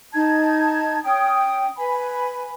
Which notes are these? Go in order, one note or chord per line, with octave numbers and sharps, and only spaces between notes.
D#4 A5 G#6
C#4 G5 D#6
B4 G#5 B5